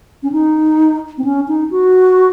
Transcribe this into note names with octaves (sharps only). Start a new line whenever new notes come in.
C#4
D#4
C4
C#4
D#4
F#4